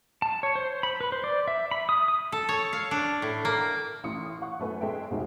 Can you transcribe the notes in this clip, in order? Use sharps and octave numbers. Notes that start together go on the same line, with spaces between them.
A5
C#5
C5
B5
B4
C5
D5
E5
B5
D#6
D#6
A4
C#5
F5
D4
A2
A#3
A1 A2 E4 C6 D#6 C#7
F#5 C#6 F#6
F#2 A3 B4 G#5
G#3 A4 E5 G5
F1 C2 D#4 F#4 G#4